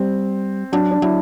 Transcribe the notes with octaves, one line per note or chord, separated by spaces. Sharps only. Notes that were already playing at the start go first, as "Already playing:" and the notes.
Already playing: G3 C4
F#3 D4
D4
F#3 E4